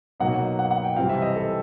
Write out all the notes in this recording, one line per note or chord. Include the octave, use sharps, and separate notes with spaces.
B2 F#3 A#3 D#4 F#5
F#5
F#5
G5
C3 E3 G3 C4 F5
E5
D#5
A4